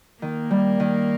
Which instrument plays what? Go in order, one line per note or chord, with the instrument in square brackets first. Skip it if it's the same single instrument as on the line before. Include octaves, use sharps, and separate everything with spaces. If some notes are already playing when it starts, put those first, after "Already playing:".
[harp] D#3 [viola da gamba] A#3
[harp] G3
D#3